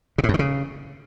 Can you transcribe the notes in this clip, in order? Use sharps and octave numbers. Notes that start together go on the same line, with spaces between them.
C3
A2
F#2
D#3
C#3